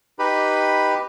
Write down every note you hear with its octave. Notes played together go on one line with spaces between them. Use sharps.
D#4 G4 B4 B5